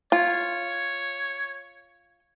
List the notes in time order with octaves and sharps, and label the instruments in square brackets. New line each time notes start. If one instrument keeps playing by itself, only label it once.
[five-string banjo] F4 [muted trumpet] C#5